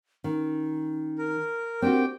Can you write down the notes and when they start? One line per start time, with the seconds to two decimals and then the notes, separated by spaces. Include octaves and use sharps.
0.24 D#3 C#4
1.18 A#4
1.82 C4 D4 F#4 G4 A#4 G5